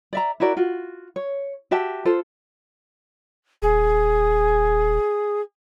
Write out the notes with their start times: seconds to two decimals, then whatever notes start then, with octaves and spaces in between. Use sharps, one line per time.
0.13 D5 E5 A#5
0.40 E4 F#4 A#4 D5
0.57 F4 F#4
1.16 C#5
1.71 F#4 G4 E5 A5
2.05 F4 A4 C5
3.62 D#1 G#4